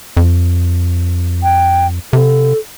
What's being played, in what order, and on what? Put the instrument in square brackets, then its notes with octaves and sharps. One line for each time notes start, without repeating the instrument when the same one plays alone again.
[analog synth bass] F2
[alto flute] G5
[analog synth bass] C3 [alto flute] A4